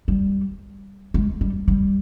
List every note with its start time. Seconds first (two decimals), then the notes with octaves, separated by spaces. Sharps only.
0.08 G3
1.14 G#3
1.41 G3
1.68 G3